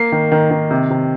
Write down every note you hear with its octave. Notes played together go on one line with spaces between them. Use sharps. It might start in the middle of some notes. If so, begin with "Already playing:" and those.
Already playing: A#3 C7
D#3
D#3
D#3
C3
C3